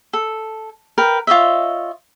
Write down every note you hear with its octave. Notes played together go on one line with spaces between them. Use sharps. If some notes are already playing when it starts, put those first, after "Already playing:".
A4
A#4 B4 G5
F4 C#5 D#5 E5